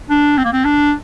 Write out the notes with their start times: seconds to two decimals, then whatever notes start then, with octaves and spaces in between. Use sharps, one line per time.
0.10 D4
0.38 C4
0.45 A#3
0.52 C4
0.65 D4